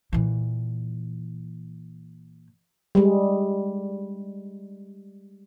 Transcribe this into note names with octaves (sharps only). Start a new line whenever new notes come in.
A#2 E3
G3 G#3